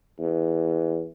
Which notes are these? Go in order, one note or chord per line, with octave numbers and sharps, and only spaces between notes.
E2